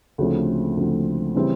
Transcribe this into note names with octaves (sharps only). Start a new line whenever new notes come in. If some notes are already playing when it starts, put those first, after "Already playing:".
D2 C#3 F3 A3 C4
D2 C#3 F3 A3 C4
C#3 E3 G3 C4